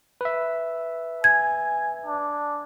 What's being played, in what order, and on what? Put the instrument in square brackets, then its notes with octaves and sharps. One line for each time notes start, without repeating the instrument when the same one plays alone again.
[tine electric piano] B4 E5
[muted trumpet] G#5 [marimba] G#6
[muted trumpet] D4